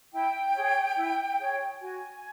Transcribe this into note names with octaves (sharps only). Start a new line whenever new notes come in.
E4 G5
G#4 C#5
E4
G#4 C#5
F#4 G#5